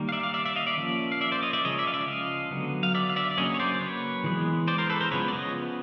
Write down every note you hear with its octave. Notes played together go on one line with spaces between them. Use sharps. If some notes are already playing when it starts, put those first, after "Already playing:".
Already playing: D#3 G3 A#3
F5
D5 E5
F5
D5 E5
D5 E5
D#5 F5
D5 E5
F3 A#3 C#4
F5
D5 E5
C5 D5
C#5 D#5
D5 E5
C#3 F3 G#3 C#5 D#5
D5 E5
F5
D5 E5
D#5 F5
D3 F#3 B3
F5
D5 E5
F5
D5 E5
D5
C#3 F#3 A#3 C#4 C#5 D#5
C#5
C5 D5
B4 C#5
E3 G#3 B3
C5 D5
A#4 C5
A4 B4
A#4 C5
C#3 F3 G#3 B3 B4 C#5
D5
C#5 D#5